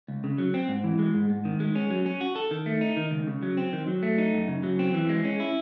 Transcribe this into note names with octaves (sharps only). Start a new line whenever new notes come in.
C#2
C#3
F#3
C4
G#2
E3
G#3
G#2
G#2
D#3
G#3
C#4
F#3
C#4
F#4
A4
D#3
A3
D#4
D#3
C#2
C#3
F#3
C4
D#3
F#3
A3
D#4
F#2
C#3
F#3
C4
E3
G#3
C#4
E4